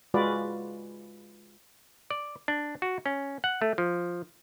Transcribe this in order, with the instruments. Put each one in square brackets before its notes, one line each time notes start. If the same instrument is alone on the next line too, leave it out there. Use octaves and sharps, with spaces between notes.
[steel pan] G#3 F4 F#4 B4 D5
[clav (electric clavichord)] D5
D4
F#4
C#4
F#5
A3
F3